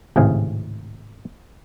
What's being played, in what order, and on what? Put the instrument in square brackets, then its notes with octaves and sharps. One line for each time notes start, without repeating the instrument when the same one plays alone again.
[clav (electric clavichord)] G#1 C#2 A2 C3 G#4 F5